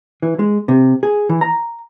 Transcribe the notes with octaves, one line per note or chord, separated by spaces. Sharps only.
E3
G#3
C3
G#4
E3
A#5